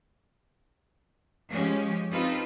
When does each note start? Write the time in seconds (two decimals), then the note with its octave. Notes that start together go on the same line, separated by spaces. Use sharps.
1.50 F3 G#3 C#4 G4
2.11 C4 D#4 F4 G4 A4 B4